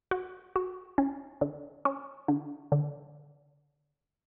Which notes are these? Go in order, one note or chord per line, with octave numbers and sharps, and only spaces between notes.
F#4
F#4
C#4
D3
C#4
D3
D3